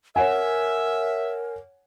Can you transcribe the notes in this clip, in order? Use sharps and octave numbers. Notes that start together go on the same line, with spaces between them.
A#4 C#5 E5 F#5 G#5